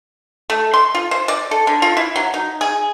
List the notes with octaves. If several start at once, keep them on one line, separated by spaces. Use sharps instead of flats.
A3
C6
F4
C5
D5
A4
D3
F4
E4
F#3
D#4
G#4